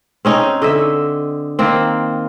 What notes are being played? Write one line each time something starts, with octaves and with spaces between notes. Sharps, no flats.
C4 C#4 D#4
D3 D#5 E5
D#3 A#3 C4